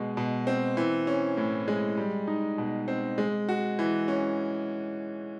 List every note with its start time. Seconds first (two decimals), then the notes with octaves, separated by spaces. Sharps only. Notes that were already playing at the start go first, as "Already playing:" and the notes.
Already playing: B2 G#3
0.17 B2
0.47 C4
0.77 E3
1.07 C#4
1.37 A2
1.68 G#3
1.97 G3
2.28 D#4
2.58 B2
2.88 C4
3.18 G#3
3.49 F#4
3.79 E3
4.08 C#4